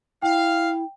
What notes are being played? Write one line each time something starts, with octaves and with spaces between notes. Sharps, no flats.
E4 F5 G5